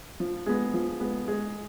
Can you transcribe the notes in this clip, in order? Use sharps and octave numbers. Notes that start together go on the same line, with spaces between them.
F3
G#3 B3
F3
G#3 B3
G#3